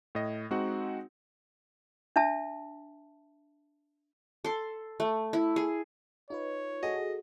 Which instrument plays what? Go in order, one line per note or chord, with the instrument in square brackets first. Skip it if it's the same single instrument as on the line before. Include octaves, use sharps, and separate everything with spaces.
[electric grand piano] A2 D#5
G#3 C4 D#4 F#4 F#5
[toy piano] D4 E5 A5
[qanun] A4 C6
A3
E4
G#4
[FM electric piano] D#4 F4 B4 [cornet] C#5
[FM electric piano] F#4 G#4 A4 [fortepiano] D#5